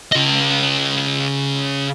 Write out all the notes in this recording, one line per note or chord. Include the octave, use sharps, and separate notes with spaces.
C#3 D#5